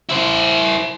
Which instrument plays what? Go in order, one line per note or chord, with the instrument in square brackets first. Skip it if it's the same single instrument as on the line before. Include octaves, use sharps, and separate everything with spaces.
[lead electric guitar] E4 C5